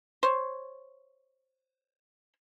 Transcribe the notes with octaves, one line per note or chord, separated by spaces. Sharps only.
C5 C#5